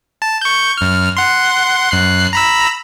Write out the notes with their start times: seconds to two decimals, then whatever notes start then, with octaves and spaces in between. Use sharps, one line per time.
0.22 A5
0.41 C#6 G6
0.77 F#2 F6
1.17 F#5 C6
1.91 F#2 F#6 C7
2.33 A#5 B5 E6